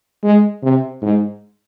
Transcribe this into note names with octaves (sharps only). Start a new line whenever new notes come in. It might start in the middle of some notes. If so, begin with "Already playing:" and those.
G#3
C3
G#2